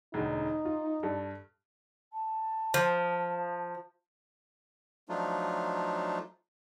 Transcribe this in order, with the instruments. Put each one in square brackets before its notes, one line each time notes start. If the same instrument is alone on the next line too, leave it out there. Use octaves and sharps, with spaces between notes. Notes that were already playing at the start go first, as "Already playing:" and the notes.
[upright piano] E1 D2 [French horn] D#4
[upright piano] F4
G2 A4
[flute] A5
[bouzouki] F3
[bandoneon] F3 F#3 A3 D4 D#4 F4